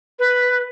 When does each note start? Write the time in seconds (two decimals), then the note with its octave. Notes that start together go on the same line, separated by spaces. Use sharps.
0.19 B4